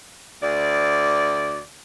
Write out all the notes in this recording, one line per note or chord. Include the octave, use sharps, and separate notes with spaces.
D2 D5